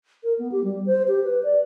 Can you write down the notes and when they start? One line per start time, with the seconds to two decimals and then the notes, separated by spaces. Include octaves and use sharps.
0.24 A#4
0.39 B3
0.52 G4
0.64 G3
0.86 C5
1.08 G4
1.24 B4
1.43 D5